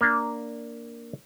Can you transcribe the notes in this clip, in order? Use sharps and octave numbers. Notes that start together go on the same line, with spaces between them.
A#3 D4